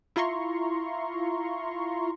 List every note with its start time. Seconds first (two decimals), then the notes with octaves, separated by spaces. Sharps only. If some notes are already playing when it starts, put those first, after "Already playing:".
0.16 E4 F4 A#5 C6 C#6